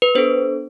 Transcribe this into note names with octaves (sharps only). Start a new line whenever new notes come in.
B4
B3 D4 A4 C5